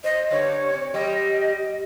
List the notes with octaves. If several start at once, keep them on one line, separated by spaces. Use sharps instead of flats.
C5 D#5
D3 G3 D4 C#5
C4
F#3 G3 G4 D#5